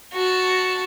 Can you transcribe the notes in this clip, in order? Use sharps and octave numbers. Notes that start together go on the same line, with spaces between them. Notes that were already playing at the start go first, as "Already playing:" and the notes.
F#4 A5